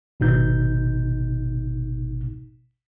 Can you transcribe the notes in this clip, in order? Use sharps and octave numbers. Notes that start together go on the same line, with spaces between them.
G#1 B2 D#4 G6